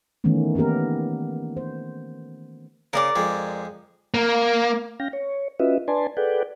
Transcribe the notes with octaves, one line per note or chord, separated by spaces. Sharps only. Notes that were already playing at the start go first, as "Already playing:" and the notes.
D#3 E3 A3 B3 C#4
A#3 B3 C#4 G4 A#4
C5
C#3 A#4 D5 D6
F2 G#3
A#3
C#4 F5 G5 A#6
C#5
C#4 F4 F#4 B4 D#5 E5
D4 B4 D5 G#5 A5 C6
G#4 A4 B4 D5 F#5 G5